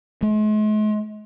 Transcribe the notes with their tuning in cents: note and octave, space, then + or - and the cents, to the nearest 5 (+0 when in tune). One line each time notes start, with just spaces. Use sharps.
G#3 +45